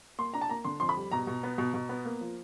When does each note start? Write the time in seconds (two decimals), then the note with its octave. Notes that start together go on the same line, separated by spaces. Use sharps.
0.18 A#3 C6
0.34 D4 A#5
0.41 A5
0.49 A#3 A#5
0.65 D3 C6
0.80 F2 C6
0.89 B5
0.96 G3
1.12 B2 A#5
1.27 B2
1.43 B3
1.58 B2
1.74 B2
1.89 B3
2.05 A#3
2.21 F3